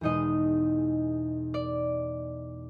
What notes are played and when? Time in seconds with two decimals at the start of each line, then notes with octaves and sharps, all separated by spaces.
0.01 E2 B2 G#3 D#4 D#5
1.54 D5